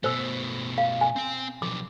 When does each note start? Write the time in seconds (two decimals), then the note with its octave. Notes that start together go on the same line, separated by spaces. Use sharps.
0.04 B2 A3 C5 E6
0.78 F5
1.01 G#5
1.16 C4 G5
1.62 B2 F3 D6